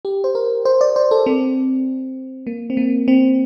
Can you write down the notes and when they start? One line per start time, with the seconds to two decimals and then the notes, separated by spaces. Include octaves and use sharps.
0.05 G4
0.24 C5
0.35 A#4
0.65 C5
0.81 D5
0.96 C5
1.11 A4
1.26 C4
2.47 A#3
2.70 C4
2.77 A#3
3.08 C4